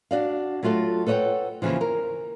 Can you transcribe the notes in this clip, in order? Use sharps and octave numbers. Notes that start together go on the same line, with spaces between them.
D4 F#4 D5 F5
F#3 A3 F4 F#4 A4
A4 B4 C#5 D#5 F#5 G5
D#2 G#2 C#3 E3 F3
A#4